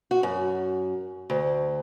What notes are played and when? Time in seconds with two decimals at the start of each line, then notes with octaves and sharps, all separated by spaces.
0.11 F#4
0.23 F#2
1.30 D2